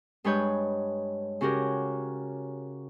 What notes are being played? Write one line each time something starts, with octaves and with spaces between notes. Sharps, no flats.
G2 G#3 B4 C#5 G6
C#3 C#4 F#4 G4 A#4